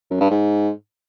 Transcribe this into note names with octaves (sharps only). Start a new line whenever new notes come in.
F#2
G2
G#2